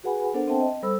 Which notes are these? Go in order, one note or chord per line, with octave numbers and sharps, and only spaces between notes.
F#4 G#4 B4 F#5 G#5 B5
B3 D4 A4 A#4 C5 F#5
C4 C5 E5 G5 A5
D#5
G3 A4 C5 B5 E6